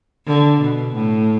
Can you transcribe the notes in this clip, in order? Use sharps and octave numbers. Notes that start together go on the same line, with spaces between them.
D3
B2
A2